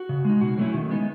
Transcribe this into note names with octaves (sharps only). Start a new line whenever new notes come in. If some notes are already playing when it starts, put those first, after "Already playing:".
Already playing: F#4
C#3
G#3 D#4
B2 F#4
F#3 A3 C#4 E4
D#3
G#3 B3 D#4